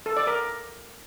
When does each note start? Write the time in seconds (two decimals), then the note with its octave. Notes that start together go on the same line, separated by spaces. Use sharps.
0.06 A4
0.17 D5
0.27 A#4